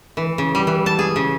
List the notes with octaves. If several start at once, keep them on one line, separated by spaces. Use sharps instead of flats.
E3
C#3
G3
E3
A5
G#4
C#3